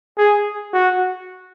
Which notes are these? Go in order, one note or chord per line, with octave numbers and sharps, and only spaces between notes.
G#4
F#4